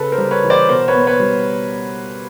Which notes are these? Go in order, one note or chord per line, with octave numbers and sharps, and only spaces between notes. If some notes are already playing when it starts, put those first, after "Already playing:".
Already playing: C#3 A4 B4
A#4 C5
G3
B4 C#5
E3
C5 D5
B2 A#4 C5
B4 C#5
B3
B4 C#5
G3